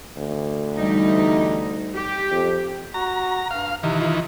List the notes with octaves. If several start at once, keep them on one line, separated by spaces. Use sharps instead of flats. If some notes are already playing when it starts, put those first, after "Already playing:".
D2
E2 G3 D#4
G4
F2
F#4 A#5
G2 F5
C3 D#3 E3
F4